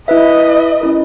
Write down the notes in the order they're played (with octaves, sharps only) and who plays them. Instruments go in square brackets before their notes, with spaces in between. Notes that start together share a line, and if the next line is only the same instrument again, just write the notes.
[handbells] E4 B4 E5 [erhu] D#5
[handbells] C#4 E4 A#4